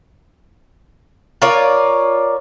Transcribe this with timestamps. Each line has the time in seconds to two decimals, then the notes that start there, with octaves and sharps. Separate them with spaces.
1.42 F4 A#4 C#5 D5